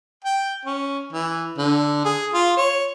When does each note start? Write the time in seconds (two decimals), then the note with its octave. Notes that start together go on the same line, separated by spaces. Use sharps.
0.24 G5
0.65 C#4
1.13 E3
1.58 D3
2.05 G#4
2.34 F4
2.57 C#5